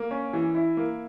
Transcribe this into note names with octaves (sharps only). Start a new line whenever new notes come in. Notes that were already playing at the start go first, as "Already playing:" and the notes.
Already playing: A#3
C#4
E3
E4
A#3